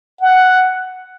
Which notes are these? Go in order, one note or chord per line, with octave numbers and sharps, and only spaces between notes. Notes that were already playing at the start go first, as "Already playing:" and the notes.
F#5